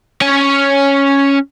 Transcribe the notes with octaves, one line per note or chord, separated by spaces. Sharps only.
C#4 C#5